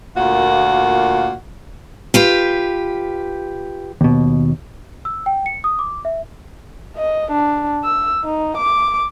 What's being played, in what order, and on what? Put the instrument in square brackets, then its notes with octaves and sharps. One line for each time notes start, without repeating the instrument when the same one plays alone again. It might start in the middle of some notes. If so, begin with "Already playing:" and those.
[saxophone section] D2 A#2 A#3 F4 F#4
[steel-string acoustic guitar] F4 G4 B4
[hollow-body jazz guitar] D#2 B2
[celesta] E6
G5
C#7
D#6
D6
E5
[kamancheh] D#5
D4
E6
D#4
D6